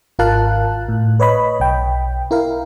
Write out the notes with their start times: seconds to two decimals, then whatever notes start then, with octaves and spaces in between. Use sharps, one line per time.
0.19 G#1 F4 A#4 F5 A5 F#6
0.89 A2
1.20 B4 C#5 D#5 B5
1.60 B1 G5
2.31 E4 A#4 F5